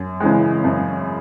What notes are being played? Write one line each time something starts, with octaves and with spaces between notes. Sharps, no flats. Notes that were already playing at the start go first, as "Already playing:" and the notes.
Already playing: F#2
C#3 E3 G#3
F#2